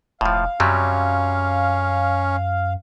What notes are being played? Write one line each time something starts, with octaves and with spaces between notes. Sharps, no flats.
E1 A2 F3 F5
F#2 C3 F#3 G3 C#4